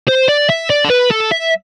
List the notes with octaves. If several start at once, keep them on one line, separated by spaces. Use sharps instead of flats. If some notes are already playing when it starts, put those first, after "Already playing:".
C5
D5
E5
D5
A4
B4
A4
E5